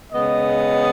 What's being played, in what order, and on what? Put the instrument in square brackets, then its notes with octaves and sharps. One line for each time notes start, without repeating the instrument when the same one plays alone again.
[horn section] C#3 G#3 B3 D#5